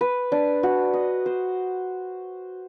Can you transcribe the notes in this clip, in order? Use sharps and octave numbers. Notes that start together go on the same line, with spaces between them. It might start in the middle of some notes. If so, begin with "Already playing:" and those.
B4
D4
F#4
D#5
C5